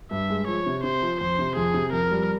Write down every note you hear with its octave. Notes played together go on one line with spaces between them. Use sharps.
G2 E5
G#3
F3 C#5
C3
C3 C5
F3
F2 C5
C3
F2 G#4
C3
F2 A#4
G3